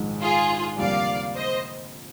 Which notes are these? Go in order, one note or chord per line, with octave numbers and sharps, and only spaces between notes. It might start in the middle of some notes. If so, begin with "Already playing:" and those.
Already playing: A#1 G#2 D#3 G#3
F4 G#4
F1 F2 D3 G3 A#3 D5 F5
C5 D#5